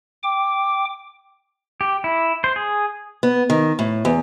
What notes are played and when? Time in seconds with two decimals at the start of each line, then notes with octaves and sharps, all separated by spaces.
0.23 G5 D6
1.81 G4
2.04 E4
2.44 C5
2.56 G#4
3.23 B3
3.50 D#3
3.79 A2
4.05 E2